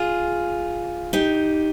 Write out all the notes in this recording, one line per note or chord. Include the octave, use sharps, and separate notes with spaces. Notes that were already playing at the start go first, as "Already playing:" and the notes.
Already playing: F4 G#4
D#4 G4